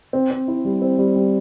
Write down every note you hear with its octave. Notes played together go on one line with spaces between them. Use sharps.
C4
C4
E4
G3
C4
G3
G3